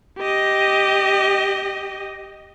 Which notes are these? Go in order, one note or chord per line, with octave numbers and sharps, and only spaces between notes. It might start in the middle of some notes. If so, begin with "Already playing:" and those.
G4 D#5